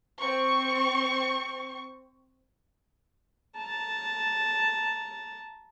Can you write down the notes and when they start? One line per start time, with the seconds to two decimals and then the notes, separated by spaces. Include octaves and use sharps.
0.20 C4 C#6
3.57 A5 A#5